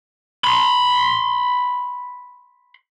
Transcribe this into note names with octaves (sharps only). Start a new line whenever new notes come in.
B5 C6